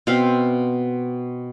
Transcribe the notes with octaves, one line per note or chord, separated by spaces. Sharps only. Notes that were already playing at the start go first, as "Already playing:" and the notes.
B2 C4 F5